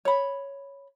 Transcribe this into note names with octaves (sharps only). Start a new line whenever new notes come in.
C#5 B5